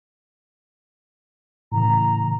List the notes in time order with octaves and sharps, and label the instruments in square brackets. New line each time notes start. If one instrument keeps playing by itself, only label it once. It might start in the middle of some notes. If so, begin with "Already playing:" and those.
[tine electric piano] A2 C#3 E3 [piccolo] A#5